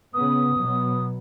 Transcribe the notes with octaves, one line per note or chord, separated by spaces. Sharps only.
C#3 B3 D#6
B2 F#3 B3